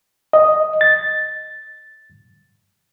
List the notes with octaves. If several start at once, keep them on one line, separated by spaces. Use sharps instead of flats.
D#5
A6